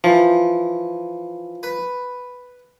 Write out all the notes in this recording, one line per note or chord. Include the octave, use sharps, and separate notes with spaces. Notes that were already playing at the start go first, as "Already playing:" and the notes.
E3 F3
B4